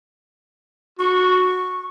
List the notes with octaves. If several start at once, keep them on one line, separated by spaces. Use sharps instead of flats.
F#4 C#6